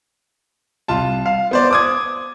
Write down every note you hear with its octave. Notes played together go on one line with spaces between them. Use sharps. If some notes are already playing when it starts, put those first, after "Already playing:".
C2 F4 A5
F5
B3 C5 D5
D6 D#6 G#6